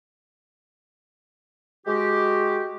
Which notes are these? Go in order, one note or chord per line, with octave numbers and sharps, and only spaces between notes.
G#3 F#4 G4